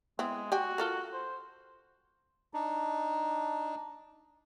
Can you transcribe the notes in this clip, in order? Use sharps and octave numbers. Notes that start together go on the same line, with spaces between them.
G#3 B3 C4 E4
F#4 G4 G5 G#5
F4 A4 A#4
C5
D4 D#4